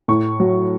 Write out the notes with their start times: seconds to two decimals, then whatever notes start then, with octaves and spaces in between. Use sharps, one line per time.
0.08 A2 C#6
0.40 F#3